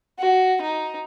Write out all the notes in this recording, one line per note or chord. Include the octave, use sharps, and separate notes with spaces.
F#4
D#4